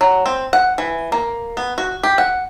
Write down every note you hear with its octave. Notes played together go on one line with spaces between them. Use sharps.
F#3
C4
F#5
E3
A#3
B3
F#4
G4
F#5